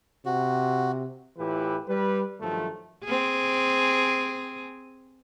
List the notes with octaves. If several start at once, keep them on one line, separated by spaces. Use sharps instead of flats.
C3 F#4
A2 E3 E4 F4 G4 B4
G3 B4
G2 D#3 F3 F#3 A3
C4 G#4